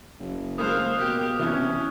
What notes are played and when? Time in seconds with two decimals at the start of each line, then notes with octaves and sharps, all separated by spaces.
0.19 F#1
0.58 G#3 A#3 C5 F5 D#6 F6 F#6
0.98 B2 G4
1.39 C3 E3 C#4 E5